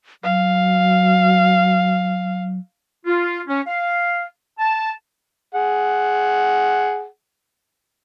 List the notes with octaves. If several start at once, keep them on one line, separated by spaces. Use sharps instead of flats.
F#3 F5
F4
C#4
F5
A5
G#4 F#5